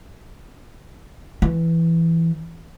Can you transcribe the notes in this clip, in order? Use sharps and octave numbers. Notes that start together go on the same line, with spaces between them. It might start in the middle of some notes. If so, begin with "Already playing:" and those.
E3